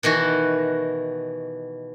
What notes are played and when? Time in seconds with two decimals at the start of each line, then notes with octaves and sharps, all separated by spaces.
0.03 B2 D#3 E3 F#4